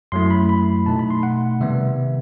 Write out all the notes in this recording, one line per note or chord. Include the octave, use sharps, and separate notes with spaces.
F#2 F#3 A3 E4 C6
B5
B5
B2 A3 D#4 A5
B5
C6
F#5
C3 D#3 G3 B3 E5